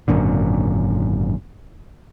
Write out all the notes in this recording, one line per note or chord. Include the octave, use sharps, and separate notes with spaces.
G#1 F#2 A#2 D3